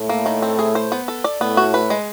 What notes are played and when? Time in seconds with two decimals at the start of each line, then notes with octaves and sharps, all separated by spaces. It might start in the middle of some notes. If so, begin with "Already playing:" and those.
Already playing: A2 A3
0.09 A#3
0.26 D#3
0.42 C4
0.59 G#4
0.75 C5
0.92 B3
1.08 A4
1.24 D5
1.41 A2 A3 B3
1.57 F#4
1.74 B4
1.90 G#3